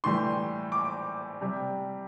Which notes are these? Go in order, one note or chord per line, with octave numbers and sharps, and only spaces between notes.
A2 E3 G3 C6
D6
C3 G3